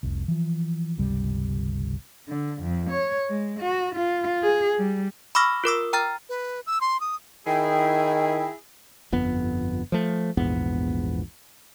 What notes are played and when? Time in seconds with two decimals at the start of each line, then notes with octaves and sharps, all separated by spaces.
0.03 F1 C2
0.28 E3 F3
0.98 G1 C#2 C3 G3
2.28 D3
2.61 F2
2.90 C#5
3.30 G#3
3.60 F#4
3.95 F4
4.43 G#4
4.78 G3
5.35 B5 C#6 D6 E6 F6 A#6
5.64 F4 A#4 D6 E6
5.93 G5 A#5 F6 A6
6.29 B4
6.67 E6
6.81 C6
7.01 D#6
7.47 D#3 E4 G#4 G5
9.12 G1 F2 B3
9.92 F3 A3
10.37 A#1 E2 G#2 B3